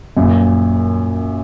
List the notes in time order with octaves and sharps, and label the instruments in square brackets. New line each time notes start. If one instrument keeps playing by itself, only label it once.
[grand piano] F#2 A#2